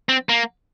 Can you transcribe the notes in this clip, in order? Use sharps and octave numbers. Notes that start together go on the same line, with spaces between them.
C4
A#3